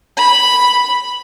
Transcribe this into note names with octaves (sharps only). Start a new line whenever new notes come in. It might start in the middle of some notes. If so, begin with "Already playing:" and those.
B5